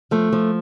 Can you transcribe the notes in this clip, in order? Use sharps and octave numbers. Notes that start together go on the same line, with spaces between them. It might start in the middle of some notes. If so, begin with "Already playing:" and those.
F3 A3
F3